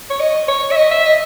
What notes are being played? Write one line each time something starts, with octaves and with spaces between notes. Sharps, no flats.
C#5
D#5
C#5
E5
D#5
E5
D#5